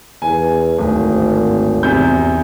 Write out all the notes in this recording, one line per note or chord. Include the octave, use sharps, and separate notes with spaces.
E2 G#5
D1 G#1
E2 C3 G6